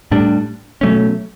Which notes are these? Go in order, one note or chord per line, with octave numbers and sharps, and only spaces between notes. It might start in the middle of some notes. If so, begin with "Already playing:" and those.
A2 G3 D4
B2 F#3 A3 C#4